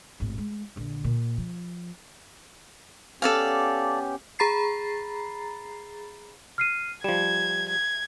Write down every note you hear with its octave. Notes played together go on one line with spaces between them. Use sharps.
G#1 A2
G#3
A#1 D3
A#2
F3
B3 C#4 G4 A4 D5 F5
G#4 A#5 B5 A6 C7
F6 C7 D#7
F3 G3 G#6 E7
G#6